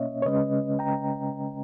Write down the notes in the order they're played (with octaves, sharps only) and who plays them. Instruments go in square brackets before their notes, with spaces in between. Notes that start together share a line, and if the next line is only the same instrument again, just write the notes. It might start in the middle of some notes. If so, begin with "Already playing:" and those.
Already playing: [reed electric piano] B2 A#3 C#4 C#5 D#5 E5
C#5
C#3 G#3 C#4 B4 D#5
G5 A#5